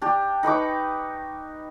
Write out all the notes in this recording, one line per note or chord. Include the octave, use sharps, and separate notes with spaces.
D4 G4
D#4 B4 C#6 D6